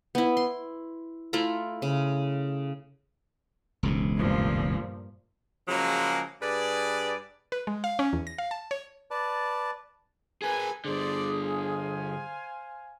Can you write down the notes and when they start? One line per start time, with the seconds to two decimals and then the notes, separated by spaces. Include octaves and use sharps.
0.15 B3 E4
0.37 C6
1.33 A3 E4 F4 A#5
1.82 C#3
3.83 E1 C#2 G#2
4.16 G2 A#2 F3
5.68 C#3 F3 F#3 G#3 A#3
6.42 G2 G#4 B4 D5
7.52 B4
7.67 G#3
7.84 F5
7.99 C#4
8.13 E2
8.27 A#6
8.38 F5
8.51 A5
8.71 C#5
9.11 B4 D5 A5
10.42 G#4 A#4 B4 G#5
10.85 G2 D3 G#4 C5 D5
11.42 C5 F5 G#5